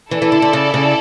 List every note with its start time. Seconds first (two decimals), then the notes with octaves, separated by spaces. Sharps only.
0.11 E3 E4 A4 D5
0.22 E3
0.32 D3
0.42 D3
0.53 C#3
0.74 C#3